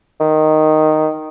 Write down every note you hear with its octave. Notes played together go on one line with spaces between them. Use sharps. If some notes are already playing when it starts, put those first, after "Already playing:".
D#3